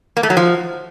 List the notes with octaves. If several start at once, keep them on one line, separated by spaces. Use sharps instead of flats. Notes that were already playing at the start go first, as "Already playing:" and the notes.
A#3
A3
F#3
F3